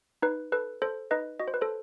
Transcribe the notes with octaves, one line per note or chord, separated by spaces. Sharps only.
D#4 B4
A4 B4
A4 C5
D#4 B4 D#5
F#4 D#5
C5
B4
A4 C5